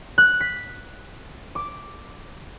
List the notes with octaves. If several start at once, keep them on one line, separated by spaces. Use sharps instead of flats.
F#6
B6
D6